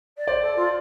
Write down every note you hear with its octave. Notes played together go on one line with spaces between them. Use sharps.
D5
C5 D5
A4
F4